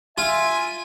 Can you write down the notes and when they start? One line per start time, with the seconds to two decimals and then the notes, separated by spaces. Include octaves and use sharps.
0.18 F4 E5 G#5